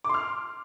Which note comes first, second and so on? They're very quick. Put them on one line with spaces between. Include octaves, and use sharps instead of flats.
D6 C6 F6